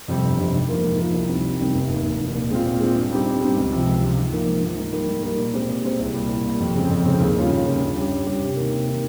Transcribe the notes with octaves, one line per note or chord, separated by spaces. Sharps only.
F2 C3 G3
G1
F2 C3 G3
G#2
F3 A#3 F4 A#4
G#2
F3 A#3 F4 A#4
C2
C3 D#3 G3 C4
C2
C3 D#3 G3 C4
F1
D#2 D#3
F1
D#2 D#3
A#2
G#3 C4 F4
A#2
G#3 C4 F4
G2
G3 C4 D#4 G4
G2
G3 C4 D#4 G4
C#2
C3 F3
C#2
C3 F3
G#2
F3 A#3 D#4
G#2
F3 A#3 D#4
G#2
G3 A#3 D#4 A#4
G#2
G3 A#3 D#4 A#4
A#2
G#3 C4 G4 C5
A#2
G#3 C4 G4 C5
C2
A#2 G3
C2
A#2 G3
F2
C#3 G#3 C4
F2
C#3 G#3 C4
D#2
C#3 G3 C#4 F4
D#2
C#3 G3 C#4 F4
G2
G3 C#4 G4
G2
G3 C#4 G4
C3
D#3 A#3
C3
D#3 A#3